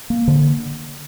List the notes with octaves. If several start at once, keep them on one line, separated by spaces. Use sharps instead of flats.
A#3
D3